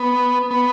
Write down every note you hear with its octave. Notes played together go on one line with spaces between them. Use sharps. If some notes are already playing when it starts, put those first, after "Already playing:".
Already playing: B3
B3